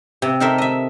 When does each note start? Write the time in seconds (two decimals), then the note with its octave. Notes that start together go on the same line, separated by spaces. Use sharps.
0.22 C3
0.40 D#4 G4 A4 A#4 C5 E5
0.58 D#5 E5